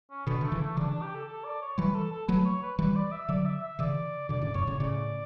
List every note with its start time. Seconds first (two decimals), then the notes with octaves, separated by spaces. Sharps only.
0.11 C#4
0.26 B2 D3 B3
0.41 D3 A3
0.52 C#3 E3
0.61 A3
0.77 C#3 E3 D4
0.91 D4
1.02 G4
1.15 A4
1.28 A4
1.44 D5
1.62 C#5
1.78 E3 G3 B4
1.94 A4
2.11 A4
2.28 F#3 A3 B4
2.45 C#5
2.62 B4
2.78 E3 G3 B4
2.96 D5
3.12 E5
3.29 D3 F#3 D5
3.45 E5
3.63 E5
3.79 C#3 E3 D5
4.29 B2 D3 D5
4.42 A2 C#3
4.54 F#2 A2 C#5
4.67 A2 C#3
4.80 A2 C#3 D5